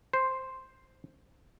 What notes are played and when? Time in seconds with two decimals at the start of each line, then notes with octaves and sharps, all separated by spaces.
0.13 C5